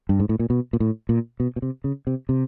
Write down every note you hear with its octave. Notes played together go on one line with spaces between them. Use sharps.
G2
G#2
A2
A#2
B2
A#2
A2
A#2
B2
B2
C3
C#3
C3
C3